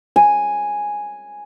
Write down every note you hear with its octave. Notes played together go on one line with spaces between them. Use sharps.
G#5